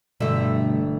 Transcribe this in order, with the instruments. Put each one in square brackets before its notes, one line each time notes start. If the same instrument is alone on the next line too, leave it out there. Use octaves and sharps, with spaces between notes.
[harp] G1 E5 [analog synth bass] B2 [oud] G3 A3